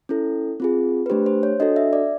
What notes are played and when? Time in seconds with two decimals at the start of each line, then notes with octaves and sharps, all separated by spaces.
0.09 C#4 E4 A4
0.60 C4 F4 G#4
1.06 B4
1.10 A3 D4 G4 C5
1.26 C5
1.43 C#5
1.60 D4 F#4 A4 D#5
1.76 E5
1.93 D5